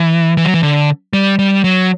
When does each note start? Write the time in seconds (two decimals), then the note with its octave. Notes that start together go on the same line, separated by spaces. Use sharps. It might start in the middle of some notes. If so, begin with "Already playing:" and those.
Already playing: E3
0.37 E3
0.45 F#3
0.54 E3
0.63 D3
1.13 G3
1.39 G3
1.64 F#3